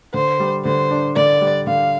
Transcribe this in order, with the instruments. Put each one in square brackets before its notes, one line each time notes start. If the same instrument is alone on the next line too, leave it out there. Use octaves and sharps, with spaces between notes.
[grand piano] D3 [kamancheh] C5
[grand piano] G3
[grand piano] D3 [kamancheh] C5
[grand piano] D4
[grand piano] D3 [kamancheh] D5
[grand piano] G3
[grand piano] D3 [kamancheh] F5